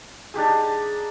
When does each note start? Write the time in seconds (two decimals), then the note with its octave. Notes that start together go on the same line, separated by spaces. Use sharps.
0.34 D4 D#4 G4 G#4